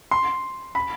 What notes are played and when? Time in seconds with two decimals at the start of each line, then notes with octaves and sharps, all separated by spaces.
0.11 C6
0.75 B5